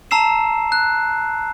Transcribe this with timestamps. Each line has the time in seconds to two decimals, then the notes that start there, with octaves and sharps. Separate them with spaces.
0.11 A5 A#5 E6 C7 E7
0.72 F#6